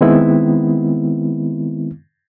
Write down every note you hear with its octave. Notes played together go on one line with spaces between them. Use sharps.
D#3 G#3 B3 C4 E4